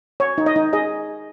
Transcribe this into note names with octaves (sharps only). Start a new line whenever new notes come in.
C#5
D#4
D#5
D#4
G#4 D#5